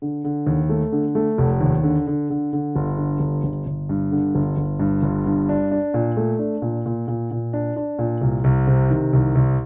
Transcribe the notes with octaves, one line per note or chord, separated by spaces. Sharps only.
D3
D3
D#2
A3
D3
A3
F1
D#2
D3
D3
D3
D3
G1
D3
G1
G1
G1
G2
D3
G1
G1
G2
G1
G2
D4
D4
A#2
A3
D4
A#2
A#2
A#2
A#2
D4
D4
A#2
C2
C2
C3
D#3
C2
C2